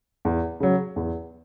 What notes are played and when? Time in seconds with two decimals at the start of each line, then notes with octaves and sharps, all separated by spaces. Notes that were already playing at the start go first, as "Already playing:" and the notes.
0.25 E2
0.60 C#3 F#3
0.96 E2